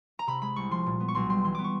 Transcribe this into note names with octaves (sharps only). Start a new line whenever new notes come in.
A#5
C3 B5
G#3 B5
C2 C#6
F3 C6
A#2
B3
C#6
B1 C6
G3 C6
E3 C6
B3 D6
C#6